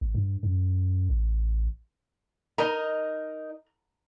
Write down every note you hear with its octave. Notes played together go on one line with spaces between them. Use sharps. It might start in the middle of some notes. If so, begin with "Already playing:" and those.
G#1
G2
F#2
A1
D#4 A#4 D#5 A#5